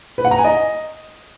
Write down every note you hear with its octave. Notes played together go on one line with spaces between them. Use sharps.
B4
F#5
A#5
G#5
D#5